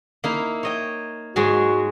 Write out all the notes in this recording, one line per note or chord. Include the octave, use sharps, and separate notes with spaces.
A#3 D#4 E4
C#5 D#5 G5
G#2 F#3 G#3 F#4